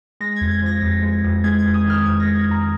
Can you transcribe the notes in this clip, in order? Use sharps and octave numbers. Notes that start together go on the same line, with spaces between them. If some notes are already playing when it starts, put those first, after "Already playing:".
G#3 A#6
F2 G#6
G#6
F3 A#6
F2
G#3
F2
G#3 G#6
G#6
F2
D#6
D#3
F6
F2 G#6
A#6
G#3
G#6
F2
A#5